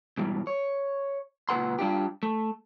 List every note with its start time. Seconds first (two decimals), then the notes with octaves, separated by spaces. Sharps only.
0.18 G#2 B2 E3 G3
0.47 C#5
1.49 C#2 A#2 A#3 B4 F#5 C6
1.79 G3 D4 F4 G4
2.23 A3